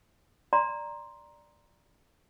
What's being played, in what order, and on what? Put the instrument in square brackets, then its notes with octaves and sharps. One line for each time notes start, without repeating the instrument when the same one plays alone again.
[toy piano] D5 A#5 C6